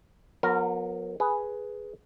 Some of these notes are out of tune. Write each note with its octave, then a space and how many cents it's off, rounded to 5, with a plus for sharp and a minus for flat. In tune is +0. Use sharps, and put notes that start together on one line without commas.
F#3 -40 B3 -5 A#4 -15
G#4 +0 B4 +0